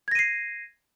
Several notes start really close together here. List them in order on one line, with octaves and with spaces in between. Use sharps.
G#6 A#6 D#7 C7